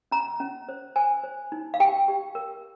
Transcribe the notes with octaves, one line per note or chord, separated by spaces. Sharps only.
C#4 A#5
C#4
C5
C5 G#5
C5
D#4
F5
G4 G5
G4
A#4